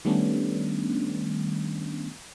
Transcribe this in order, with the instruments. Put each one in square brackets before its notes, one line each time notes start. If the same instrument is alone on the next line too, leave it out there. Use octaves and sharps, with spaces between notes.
[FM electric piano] D#3 G3 A3 B3 C#4 D4